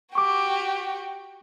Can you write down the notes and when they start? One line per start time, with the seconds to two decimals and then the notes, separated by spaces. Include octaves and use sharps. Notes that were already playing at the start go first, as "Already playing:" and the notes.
0.15 F#4 G4 C#6 D6